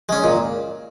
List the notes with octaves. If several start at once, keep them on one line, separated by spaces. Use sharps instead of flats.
G#3 C#4
A#2